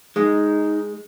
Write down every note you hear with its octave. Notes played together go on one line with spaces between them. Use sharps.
G#3 D#4